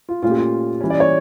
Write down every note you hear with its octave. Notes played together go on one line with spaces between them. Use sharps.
F4
A#2 A3 C#4 F4
G4
F4
E3 G3 C#4
D5
C#5